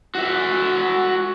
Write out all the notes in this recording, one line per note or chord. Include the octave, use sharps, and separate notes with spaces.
F#4 E5